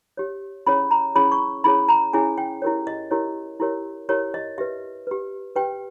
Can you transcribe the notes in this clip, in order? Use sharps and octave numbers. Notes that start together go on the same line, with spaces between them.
G4 C#5
C#4 E4 G#4 C#5 B5
A#5
C#4 E4 G#4 C#5 B5
C#6
C#4 E4 G#4 C#5 B5
A#5
C#4 E4 G#4 C#5 G#5
G5
E4 G4 A#4 C#5
D#5
E4 G4 A#4 C#5
E4 G4 A#4 C#5
E4 G4 A#4 C#5
D#5
G4 B4 E5
G4 B4
G4 B4 G5